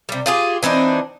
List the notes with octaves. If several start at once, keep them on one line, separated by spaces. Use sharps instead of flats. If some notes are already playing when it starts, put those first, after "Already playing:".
C3 G3
F4 G4 G#4
E3 C4 D4 D#4